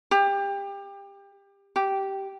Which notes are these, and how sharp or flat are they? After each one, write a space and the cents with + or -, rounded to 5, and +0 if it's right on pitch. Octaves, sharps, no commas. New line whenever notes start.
G4 +25
G4 -10